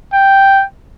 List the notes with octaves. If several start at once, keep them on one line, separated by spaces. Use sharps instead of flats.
G5